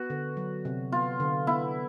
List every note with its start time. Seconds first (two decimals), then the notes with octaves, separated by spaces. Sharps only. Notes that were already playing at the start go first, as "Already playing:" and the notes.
Already playing: B3 F#4
0.10 D3
0.37 F#3
0.65 C3
0.92 B3 F4
1.20 D3
1.47 B3 E4